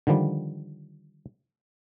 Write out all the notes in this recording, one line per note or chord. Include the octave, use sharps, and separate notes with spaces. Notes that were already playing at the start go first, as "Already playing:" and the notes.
D3 D#3 F3 G3